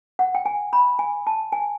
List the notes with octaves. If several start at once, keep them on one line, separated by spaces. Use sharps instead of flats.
F#5
G5
G#5
B5
G#5
A5
G#5